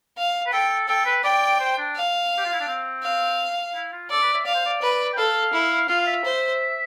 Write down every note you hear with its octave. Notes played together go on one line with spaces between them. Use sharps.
F5
B4
A4 G5
A4 G5
B4
D5 G5
C5
D4
F5
G4
F4
E4
D4
C4
F5
E4
F4
A4 D5
B4
E5
D5 F5
C5
D5
B4
G5
A4 F5
E4
F4 F5
F5
E5
C5